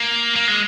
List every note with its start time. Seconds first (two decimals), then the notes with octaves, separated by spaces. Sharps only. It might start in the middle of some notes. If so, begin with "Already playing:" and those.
Already playing: A#3
0.36 A#3
0.48 G#3